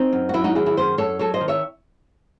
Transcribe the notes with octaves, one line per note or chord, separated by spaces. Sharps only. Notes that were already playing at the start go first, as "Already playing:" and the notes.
Already playing: C4 D#4
F#2
F#4
F#3 C#4 E4
D#4 F#4
D#3 E4 G#4
E4 G#4
F#2 G#4 C5
F#2 A4 C#5
F#3 A4 C#5
C5 D#5
D#3
C#5 E5